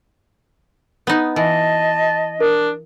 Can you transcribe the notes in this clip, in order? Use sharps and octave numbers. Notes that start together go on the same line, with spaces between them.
B3 D#4
E3 D#5 A5
D4 A#4